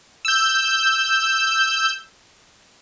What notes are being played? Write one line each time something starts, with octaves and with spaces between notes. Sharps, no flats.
E6 G6